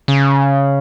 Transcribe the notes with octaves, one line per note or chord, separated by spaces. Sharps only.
C#3